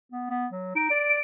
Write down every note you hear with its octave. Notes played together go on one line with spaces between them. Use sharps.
B3
B3
F#3
D#4 D7
D5